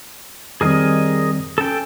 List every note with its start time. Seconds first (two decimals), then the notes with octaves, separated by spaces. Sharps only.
0.61 F2 D#3 G3 C4 G#4 A#4 D#5
1.58 C#4 A4 G5